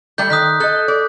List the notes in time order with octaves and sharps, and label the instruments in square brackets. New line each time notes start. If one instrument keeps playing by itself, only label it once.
[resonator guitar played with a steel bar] G3 A3 A4 [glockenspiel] G6
[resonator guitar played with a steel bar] D#3 [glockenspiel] D#6 F#6 B6
[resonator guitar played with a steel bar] A4 D#5 [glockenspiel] F#6
[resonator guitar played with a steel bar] D5